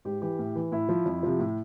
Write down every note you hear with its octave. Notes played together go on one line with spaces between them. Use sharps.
G#2 G4
E3 G4
A2
E3
A2 E4
F3
F2
C3 F3
A2